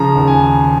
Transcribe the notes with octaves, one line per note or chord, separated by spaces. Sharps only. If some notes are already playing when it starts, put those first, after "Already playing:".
Already playing: C#3 F3 A#5
D#2
G#5